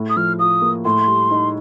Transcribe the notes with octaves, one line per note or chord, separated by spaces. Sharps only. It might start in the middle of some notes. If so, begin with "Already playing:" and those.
Already playing: A2
D#6
F3 F6
F4 D#6
A#3
A2 C6
G3
D#4